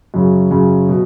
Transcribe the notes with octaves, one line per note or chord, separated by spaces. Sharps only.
F#2 C#3 F#3
F#2 C#3 F#3
B2 F#3